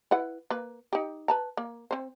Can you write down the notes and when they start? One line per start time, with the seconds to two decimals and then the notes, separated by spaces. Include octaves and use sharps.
0.11 E4 B4 F#5
0.50 A#3 B4
0.93 D#4 G4
1.28 B4 A5 A#5
1.57 A#3
1.91 C4 C5